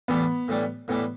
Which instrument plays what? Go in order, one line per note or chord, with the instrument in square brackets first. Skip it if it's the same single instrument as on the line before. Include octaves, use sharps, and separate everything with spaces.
[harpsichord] A2 E3 G3 D4 [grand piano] B3
[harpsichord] A2 E3 G3 D4
[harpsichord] A2 E3 G3 D4 [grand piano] B3